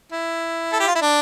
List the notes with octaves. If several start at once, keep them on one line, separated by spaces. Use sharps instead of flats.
E4
A4
G4
F4
E4
D4